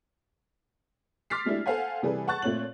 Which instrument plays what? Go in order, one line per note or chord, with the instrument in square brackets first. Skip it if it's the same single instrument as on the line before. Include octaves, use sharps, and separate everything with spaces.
[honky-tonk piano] C6 D6 F6 A6 B6 C7
F#3 G#3 A3 D4 E4 G4
A4 C5 F5 F#5 G#5
C3 E3 G3 G#4 A4 B4
F#5 A5 C#6 F#6 A6
A#2 A3 C4 C#5 F#7